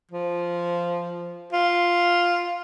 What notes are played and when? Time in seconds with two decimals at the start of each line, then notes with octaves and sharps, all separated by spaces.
0.11 F3
1.52 F4